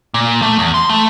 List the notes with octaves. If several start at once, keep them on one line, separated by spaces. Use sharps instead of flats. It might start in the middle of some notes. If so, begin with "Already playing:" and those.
A#2
A3
E2
C6
A3